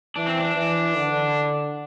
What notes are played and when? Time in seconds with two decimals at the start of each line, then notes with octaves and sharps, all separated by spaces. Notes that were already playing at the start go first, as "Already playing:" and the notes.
0.16 E3 D4
0.26 C4
0.37 D4
0.55 E3
0.95 D3